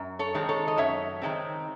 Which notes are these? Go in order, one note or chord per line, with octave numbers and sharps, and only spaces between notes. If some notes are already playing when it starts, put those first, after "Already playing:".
Already playing: F#2
A4 C#5
D#3 G#3 C4
A4 C#5
D#5
F#2 C#5 E5
D#3 G#3 C4